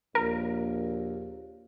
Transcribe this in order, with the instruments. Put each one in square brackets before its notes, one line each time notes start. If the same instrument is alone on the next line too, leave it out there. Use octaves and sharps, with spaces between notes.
[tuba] A#1 [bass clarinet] D#2 [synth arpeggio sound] A#4